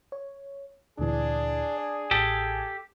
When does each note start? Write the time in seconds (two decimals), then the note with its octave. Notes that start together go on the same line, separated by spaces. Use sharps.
0.12 C#5
0.99 D2 A#2 E3 D4 G#4
1.78 D5
2.11 A1 G4 A4 G5 G#6